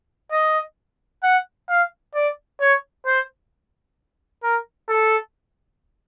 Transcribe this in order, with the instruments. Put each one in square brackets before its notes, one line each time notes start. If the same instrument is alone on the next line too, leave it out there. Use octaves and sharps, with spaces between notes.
[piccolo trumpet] D#5
F#5
F5
D5
C#5
C5
A#4
A4